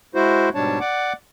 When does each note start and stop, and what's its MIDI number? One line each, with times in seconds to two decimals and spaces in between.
0.15 0.49 56
0.15 0.49 64
0.15 0.49 66
0.15 0.49 72
0.55 0.79 44
0.55 0.79 47
0.55 0.79 55
0.55 0.79 62
0.55 0.79 73
0.55 0.79 81
0.80 1.13 74
0.80 1.13 78
0.80 1.13 86